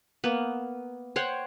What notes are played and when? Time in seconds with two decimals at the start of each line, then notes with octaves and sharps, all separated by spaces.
0.24 A#3 B3
1.16 C5 C#5 F#5 G5